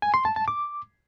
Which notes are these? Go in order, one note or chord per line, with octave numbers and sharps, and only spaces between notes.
G#5
C6
A5
A5
D6